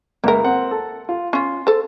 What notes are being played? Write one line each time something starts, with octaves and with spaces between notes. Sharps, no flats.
C#2 A#3 A#4 E5
C4 F#5
A4
F4
C#4 F4 C6
A4 C5